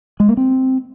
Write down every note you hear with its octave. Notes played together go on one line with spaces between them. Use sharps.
G#3
A#3
C4